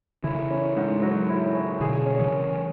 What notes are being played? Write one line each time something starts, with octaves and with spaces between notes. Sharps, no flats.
C#3 E3 E4
C#4
G#2
F#3
E4
C#4
B2 D3 G#4
C#4
C#3 E3